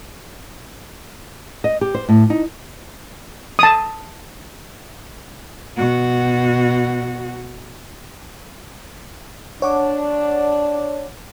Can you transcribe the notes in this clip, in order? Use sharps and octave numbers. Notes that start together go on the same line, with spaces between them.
D#5
G4
C5
A2
D#4
A5 D#6
B2 F#4
D4 C#5 F#5 D6